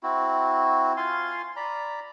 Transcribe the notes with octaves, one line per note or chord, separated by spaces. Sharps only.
C4 E4 F#4
F4 F5 G#5 C6
D5 A#5 B5